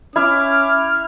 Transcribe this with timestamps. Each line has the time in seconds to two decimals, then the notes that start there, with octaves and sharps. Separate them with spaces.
0.16 C#4 E4 D6 F6